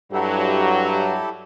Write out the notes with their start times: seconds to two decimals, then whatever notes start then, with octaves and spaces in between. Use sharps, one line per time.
0.13 G2 F#3 E4 G4 A4